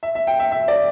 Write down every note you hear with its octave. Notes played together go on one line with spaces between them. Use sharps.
E5
E5
G5
E5
E5
D5